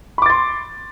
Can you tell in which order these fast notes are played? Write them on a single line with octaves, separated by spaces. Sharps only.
B5 D6 A6 C6